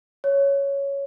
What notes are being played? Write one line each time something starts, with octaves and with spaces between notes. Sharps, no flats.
C#5